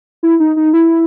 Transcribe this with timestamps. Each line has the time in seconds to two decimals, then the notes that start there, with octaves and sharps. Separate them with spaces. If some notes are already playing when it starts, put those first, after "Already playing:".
0.23 E4
0.40 D#4
0.56 D#4
0.73 E4